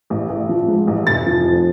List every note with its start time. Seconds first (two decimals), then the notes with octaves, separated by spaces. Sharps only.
0.10 A1
0.29 A1
0.49 F3
0.68 G#2
0.87 A1
1.07 F1 A6
1.26 F3
1.45 F2